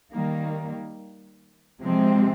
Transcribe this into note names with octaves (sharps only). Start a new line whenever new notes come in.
D#3 G3 A#3
C3 F3 G#3 C4